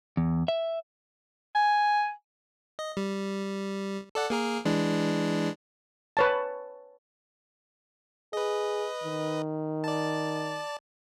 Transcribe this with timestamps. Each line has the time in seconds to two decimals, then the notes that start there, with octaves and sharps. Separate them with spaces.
0.17 E2
0.48 E5
1.55 G#5
2.79 D#5
2.97 G3
4.15 A4 D5 F#5
4.30 A#3 G#4 A#4
4.65 E3 G#3 D4
6.17 B4 C#5 A5
8.33 G#4 B4 D#5
9.04 D#3
9.84 D5 A5